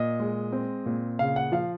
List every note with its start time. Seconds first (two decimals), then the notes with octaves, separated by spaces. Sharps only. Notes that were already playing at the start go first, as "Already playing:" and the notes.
Already playing: A#2 D#5
0.20 G#3
0.52 C4
0.86 A#2
1.19 C#3 F5
1.36 F#5
1.52 F3 F5